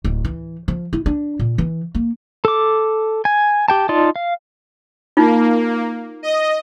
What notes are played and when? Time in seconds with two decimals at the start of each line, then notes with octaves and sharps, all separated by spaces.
0.04 D1
0.25 E3
0.68 F3
0.93 E4
1.06 D4
1.39 A#2
1.58 E3
1.95 A#3
2.45 A4 D6
3.25 G#5
3.68 G4 G5 A5
3.89 D#4 F4 D5 A5
4.16 F5
5.17 A#3 D#4 F4
6.23 D#5